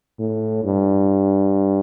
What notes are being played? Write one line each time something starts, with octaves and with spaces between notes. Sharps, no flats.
A2
G2